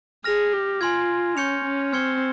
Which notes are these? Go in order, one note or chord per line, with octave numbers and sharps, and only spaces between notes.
G#4 F6 A#6 F7
G4
F4 G#5 C6 F6 G#6
C#4 C#6 G6 C#7 F7
C#4
C4 F6 G#6 C#7 G7